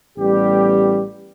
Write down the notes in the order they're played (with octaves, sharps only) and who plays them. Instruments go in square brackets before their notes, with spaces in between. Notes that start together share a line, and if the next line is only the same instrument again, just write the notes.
[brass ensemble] A1 G3 B3 G4